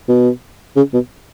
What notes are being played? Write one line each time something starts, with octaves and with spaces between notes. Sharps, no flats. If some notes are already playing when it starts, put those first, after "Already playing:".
B2
C#3
B2